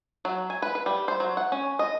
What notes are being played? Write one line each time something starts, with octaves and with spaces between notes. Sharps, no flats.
F#3
G#5
B4
B4
G3
C5
F#3
F#5
C#4
D#5